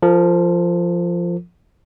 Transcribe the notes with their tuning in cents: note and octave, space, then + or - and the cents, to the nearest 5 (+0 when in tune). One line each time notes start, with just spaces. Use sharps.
F3 -5 A#4 -45